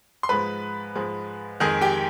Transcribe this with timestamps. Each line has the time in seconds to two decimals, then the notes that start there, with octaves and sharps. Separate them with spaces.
0.23 C6
0.29 G#2 F3 G#3 B4 B5
0.95 G#2 F3 G#3
1.60 F2 D#3 G#3 G#4 G#5
1.81 G4 G5